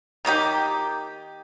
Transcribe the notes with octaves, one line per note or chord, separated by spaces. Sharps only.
D#3 A#3 D#4 G4